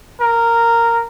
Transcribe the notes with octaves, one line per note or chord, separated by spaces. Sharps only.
A#4